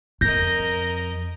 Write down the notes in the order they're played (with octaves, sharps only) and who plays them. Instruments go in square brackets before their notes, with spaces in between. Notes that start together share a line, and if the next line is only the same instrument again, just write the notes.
[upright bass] F2 [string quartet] A#4 D#5 [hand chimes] G6 A#6